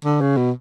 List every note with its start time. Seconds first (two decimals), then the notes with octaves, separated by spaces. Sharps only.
0.04 D3
0.21 C#3
0.37 B2